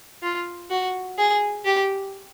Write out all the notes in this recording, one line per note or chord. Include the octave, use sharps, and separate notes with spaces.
F4
F#4
G#4
G4